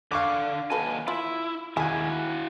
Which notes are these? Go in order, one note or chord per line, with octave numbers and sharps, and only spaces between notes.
D3 F5 C#6 D6
D#2 F#4 A4 B4 G#5
E4 F4
D#2 E4 F#4 G#4 G#5